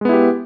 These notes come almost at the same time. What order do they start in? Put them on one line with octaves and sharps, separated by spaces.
G#3 B3 E4 G4